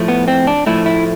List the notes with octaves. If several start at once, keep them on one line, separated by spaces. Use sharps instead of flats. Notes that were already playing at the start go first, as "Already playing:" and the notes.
Already playing: A2 F3 A3
B3
C4
D4
A2 F3 A3 E4
E4